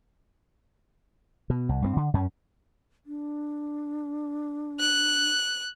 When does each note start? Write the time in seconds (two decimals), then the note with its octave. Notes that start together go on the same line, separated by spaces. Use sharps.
1.50 B2
1.69 C2
1.82 G2 A3 C4
1.96 D3
2.14 F#2 C#4
3.06 D4
4.80 F#6